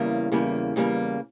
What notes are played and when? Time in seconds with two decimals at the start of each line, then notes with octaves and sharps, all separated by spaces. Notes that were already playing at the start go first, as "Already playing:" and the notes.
Already playing: E2 C#3 G3 A#3
0.32 E2 C#3 G3 A#3
0.76 E2 C#3 G3 A#3